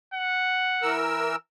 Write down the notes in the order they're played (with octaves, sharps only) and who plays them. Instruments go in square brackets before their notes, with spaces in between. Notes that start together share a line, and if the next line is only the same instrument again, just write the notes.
[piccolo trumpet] F#5
[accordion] E3 A#4 E6